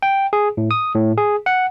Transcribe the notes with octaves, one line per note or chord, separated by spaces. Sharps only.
G5
G#4
A2
D#6
A2
G#4
F#5